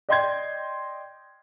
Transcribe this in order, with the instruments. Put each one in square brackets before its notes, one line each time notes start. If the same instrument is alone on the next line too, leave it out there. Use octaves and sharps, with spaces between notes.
[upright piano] D5 D#5 G5 C6 G6 G#6